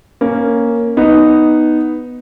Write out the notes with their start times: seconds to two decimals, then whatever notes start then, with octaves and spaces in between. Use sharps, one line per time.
0.21 A#3 C#4
0.97 B3 D#4